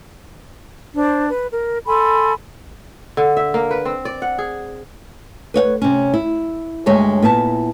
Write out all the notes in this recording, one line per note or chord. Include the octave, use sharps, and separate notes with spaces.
D4 C5
B4
A#4
A4 G#5 B5 C6
D3
E5
A#3
B4
C4
D5
F#5
G#4
B4 C#5 F5 F#5
C3 C#4
E4
D2 G2 G#3 C#5 E5
A#2 B3 E4 A5